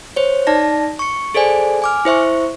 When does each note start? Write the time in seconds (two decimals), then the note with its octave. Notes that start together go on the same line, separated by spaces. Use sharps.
0.16 C5 C#5
0.47 D#4 D5 A5 A#6
0.99 C#6 C#7
1.34 G#4 A4 C5 D5 G#5
1.82 G#5 D6 F6
2.05 E4 C5 E5 C#6